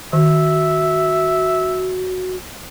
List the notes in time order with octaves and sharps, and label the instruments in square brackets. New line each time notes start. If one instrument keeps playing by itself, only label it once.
[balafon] D#3 [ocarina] F#4 [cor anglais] E5